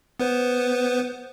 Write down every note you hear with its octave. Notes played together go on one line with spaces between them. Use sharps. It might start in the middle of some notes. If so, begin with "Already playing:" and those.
B3 B4 C5